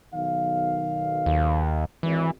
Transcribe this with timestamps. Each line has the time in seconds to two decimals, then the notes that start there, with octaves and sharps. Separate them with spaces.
0.13 B1 D#3 F5
1.26 D#2
2.03 G#1 E3